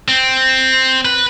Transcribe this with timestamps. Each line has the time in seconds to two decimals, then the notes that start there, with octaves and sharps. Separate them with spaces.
0.08 C4
1.05 B4